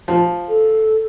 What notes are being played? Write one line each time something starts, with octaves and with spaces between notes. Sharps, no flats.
F3
A4